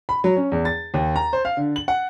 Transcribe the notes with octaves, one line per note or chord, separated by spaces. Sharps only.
B5
F#3
C#4
E2
A6
D#2
A#5
C5
F5
D3
F#7
F#5